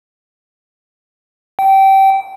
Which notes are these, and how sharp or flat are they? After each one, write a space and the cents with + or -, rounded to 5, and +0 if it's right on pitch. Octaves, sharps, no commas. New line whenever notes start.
G5 -20